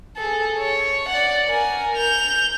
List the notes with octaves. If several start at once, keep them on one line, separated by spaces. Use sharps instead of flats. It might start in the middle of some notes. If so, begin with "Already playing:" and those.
G#4 A4
C#5
D5 F#5
A#4 G#5
G6 F7